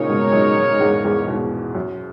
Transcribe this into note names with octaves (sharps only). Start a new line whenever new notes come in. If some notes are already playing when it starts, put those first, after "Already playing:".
Already playing: A#2 C#3 G#3 D#4 A#4 C#5
G#2 B2
F#2 A#2
F#2
E2 G#2
E2 G#2
G#2 B2
F#2